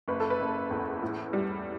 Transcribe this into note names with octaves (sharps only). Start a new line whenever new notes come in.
F#1 B4
A4
B4
F#1
E2
A2
G3